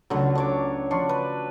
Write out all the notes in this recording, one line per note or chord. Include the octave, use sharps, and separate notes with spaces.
C#2 D3 F#3 A3
D4 C#5 D6
F3 D4 C6 C#6
B4